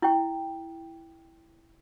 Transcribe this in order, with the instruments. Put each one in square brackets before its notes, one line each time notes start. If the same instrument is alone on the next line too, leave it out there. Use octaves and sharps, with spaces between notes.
[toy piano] E4 G5